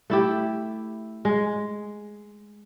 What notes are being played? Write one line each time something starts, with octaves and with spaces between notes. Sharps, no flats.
A3 E4 G4
G#3